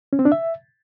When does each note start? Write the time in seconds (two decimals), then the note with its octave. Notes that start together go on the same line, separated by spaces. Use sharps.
0.13 C#4
0.19 C4
0.25 D4
0.32 E5